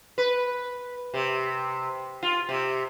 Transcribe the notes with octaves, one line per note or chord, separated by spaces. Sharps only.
B4
C3
F4
C3